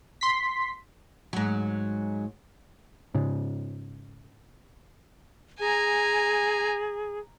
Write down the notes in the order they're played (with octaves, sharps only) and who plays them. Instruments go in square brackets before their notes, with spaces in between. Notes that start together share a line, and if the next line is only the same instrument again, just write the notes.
[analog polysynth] C6 B6
[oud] G#2 F#3
[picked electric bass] G#2 C#3
[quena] G#4 [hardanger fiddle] G#5 A#5